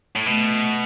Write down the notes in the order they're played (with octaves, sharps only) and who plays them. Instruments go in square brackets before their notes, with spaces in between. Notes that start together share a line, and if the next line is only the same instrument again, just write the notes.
[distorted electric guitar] A2
[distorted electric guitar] B2 [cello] A3